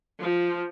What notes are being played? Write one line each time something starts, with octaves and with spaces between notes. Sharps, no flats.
F3